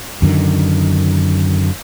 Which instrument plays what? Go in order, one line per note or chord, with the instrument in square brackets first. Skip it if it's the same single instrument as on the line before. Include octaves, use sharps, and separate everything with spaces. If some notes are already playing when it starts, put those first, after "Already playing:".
[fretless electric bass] F#2 D3 D#3